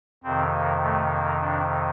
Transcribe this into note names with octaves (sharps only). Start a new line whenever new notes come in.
F2 C3 D#3 C4
A#3
A3
A#3
D4